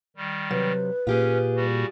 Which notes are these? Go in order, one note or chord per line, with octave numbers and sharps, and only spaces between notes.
D#3 G3
C3 F#3 B4
A#2 C#4 F4 G4 G#4
G3 F#4